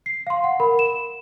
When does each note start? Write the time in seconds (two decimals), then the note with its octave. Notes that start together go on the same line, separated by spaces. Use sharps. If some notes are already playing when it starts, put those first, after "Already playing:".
0.06 C7
0.27 F5 C6
0.44 F#5
0.60 A#4 B5
0.79 E7